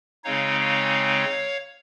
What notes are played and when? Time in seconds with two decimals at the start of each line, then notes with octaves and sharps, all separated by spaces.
0.24 C#3 G#3 C4 D#4 C#5 F5
0.61 C#5 F5